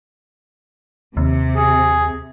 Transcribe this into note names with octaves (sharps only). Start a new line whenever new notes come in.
D#2 C3
G#4